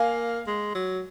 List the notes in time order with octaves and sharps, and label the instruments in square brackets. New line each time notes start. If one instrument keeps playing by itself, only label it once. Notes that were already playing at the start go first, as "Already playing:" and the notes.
Already playing: [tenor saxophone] A#3 [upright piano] F5 G#5
[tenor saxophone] G#3
F#3